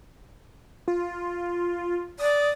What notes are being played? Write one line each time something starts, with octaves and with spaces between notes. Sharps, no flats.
F4
D5 D#6